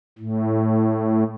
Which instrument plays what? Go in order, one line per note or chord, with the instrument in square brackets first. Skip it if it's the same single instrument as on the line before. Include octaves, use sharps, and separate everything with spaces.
[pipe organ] A2